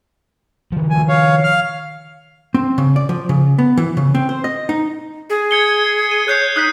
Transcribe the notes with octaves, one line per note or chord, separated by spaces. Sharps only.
D#3 F3
D2 G#5
C#5 F5
F5 F6
C4
C#3
D5
F3
C#3
B3
E3
C#3
C4
C5
D#5
D#4
G#4
G#6 C#7 G7
D#7
C#5 F#6 G6 C7
D#4 D#6 F#6 B6